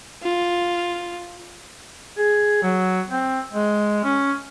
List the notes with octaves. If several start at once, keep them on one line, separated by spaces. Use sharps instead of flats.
F4
G#4
F#3
C4
G#3
C#4